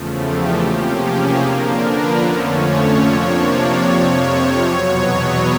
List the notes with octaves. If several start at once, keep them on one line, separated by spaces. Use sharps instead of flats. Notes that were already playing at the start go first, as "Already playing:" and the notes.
Already playing: E2 C#3 F3 A3
G4
C3 F3 A#3 C#4 G4
G#4
D3 F3 A#3 D4 A#4
B4
F2 D3 F3 A3 C#4 C#5
C3 F3 A#3 D4
D5
F2 C3 F3 C#5
C#5
E2 B2 F#3 B3